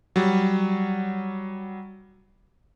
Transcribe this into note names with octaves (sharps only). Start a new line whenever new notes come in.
F#3 G3